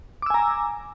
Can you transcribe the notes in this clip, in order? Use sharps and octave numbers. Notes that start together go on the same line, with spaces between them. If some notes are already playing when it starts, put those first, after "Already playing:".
G#5 A#5 D6 E6